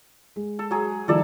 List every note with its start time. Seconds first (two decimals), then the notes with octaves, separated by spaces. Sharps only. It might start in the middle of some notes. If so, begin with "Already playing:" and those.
0.36 G#3
0.59 A4
0.71 F#3 G#4
1.08 D#3 F3 G3 A4 D5 E5